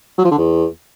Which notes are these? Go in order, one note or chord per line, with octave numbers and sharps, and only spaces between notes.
F#3
F3
D3
E2